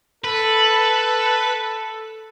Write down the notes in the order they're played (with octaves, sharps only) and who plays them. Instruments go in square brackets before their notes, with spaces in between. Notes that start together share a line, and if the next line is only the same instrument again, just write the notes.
[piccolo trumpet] A4 [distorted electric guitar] B4